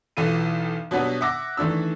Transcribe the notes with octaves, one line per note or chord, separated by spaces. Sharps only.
B1 E3 F4 A4 D#7
B2 F#3 G3 B3 D4
E5 F#5 D6 E6 A#6
D#3 E3 A3 D4 E6